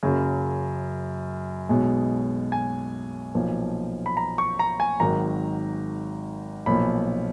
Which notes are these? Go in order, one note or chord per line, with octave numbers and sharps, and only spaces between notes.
F#1 F#2 C#3 F#3
B1 B2 G#3
G#5
B1 A#2 F3
B5
A#5
C#6
A#5
G#5
G#1 G#2 D#3 F#3 A#5
B1 A#2 F3 B5